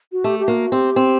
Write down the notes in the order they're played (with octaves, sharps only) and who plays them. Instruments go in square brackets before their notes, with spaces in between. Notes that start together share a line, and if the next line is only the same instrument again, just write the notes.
[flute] F#4
[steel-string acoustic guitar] A3 [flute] G4
[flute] G4
[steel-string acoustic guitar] A#3 [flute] F#4
[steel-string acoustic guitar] C4 [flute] G4
[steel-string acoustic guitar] C4